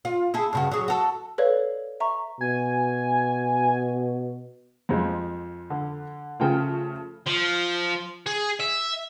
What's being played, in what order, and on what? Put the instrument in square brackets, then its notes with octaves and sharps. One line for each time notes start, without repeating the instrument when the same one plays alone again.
[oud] F4
E4 G#4 A4
G2 C#3 F#4
F#3 G#4
F#4 A4
[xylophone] A4 B4 C#5 D5 F5
E5 A#5 C#6
[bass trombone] B2 [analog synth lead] G#5
[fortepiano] F2 F3 G#3
[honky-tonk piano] D3
[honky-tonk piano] C#3 F3 A3 [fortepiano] F4 G5 G#5
[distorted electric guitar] F3
G#4
E5